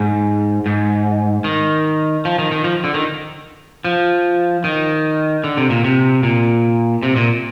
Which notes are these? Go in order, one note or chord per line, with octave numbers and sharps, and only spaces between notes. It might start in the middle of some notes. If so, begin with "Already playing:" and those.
Already playing: G#2
G#2
D#3
F3
D#3
D#3
F3
D3
D#3
F3
D#3
D3
C3
A#2
C3
A#2
C3
A#2